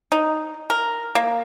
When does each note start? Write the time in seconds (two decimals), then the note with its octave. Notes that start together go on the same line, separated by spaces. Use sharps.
0.12 D#4
0.70 A#4
1.15 A#3